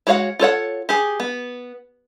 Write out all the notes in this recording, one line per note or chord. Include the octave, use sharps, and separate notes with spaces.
G#3 F#4 C#5 F5 F#5
F4 A4 C#5 F#5
G4 G#4
B3